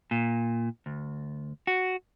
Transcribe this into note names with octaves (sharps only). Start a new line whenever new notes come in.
A#2
D2
F#4